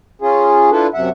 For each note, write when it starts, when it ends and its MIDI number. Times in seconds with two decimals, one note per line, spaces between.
0.22 0.70 61
0.22 0.70 65
0.22 0.70 68
0.71 0.87 62
0.71 0.87 64
0.71 0.87 65
0.71 0.87 69
0.71 0.87 71
0.94 1.09 42
0.94 1.09 48
0.94 1.09 76
0.94 1.09 78